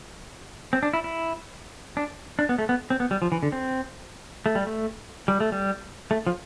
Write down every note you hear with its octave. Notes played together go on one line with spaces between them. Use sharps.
C4
D4
E4
E4
D4
D4
B3
A3
B3
C4
B3
G3
F3
E3
D3
C4
A3
G3
A3
G3
A3
G3
A3
F3